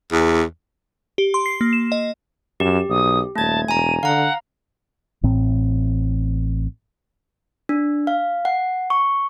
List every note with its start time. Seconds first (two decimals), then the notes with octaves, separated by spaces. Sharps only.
0.12 E2
1.18 G4
1.34 C6
1.46 C7
1.61 A#3
1.73 E7
1.92 D#5
2.60 F#2 G4 E7
2.89 B1 D#6
3.36 D#1 A3 A5 G#6
3.68 E1 G#5 A#5 D#7
4.03 D3 F5 F#5 A#5
5.23 A1 A2 C4
7.69 D4
8.07 F5
8.45 F#5
8.90 C#6